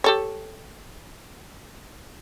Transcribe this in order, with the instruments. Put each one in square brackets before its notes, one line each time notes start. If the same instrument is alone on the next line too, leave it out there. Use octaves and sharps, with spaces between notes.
[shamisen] G4 A4 C#5